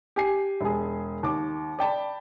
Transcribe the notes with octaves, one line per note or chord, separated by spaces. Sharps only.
G4 G#5 C7
E1 G#4
D#2 D6
D5 G5 A5 B5